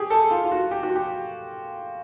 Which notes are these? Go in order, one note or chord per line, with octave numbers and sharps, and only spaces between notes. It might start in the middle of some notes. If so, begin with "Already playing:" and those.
Already playing: G4 G#4
A4
F4
F4
F#4
G4
F#4
G4